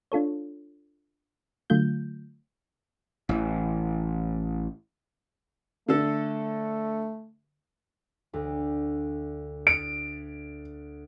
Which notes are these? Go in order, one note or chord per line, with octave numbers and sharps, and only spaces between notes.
D4 F4 A4 C#5
D3 F#3 A3 F4 G6
A1 E3
D3 A3 A4
D2
D7